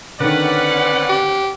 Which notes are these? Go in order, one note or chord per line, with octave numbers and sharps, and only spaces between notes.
D3 D#3 C4 C#4 B4 D5 F#5
G4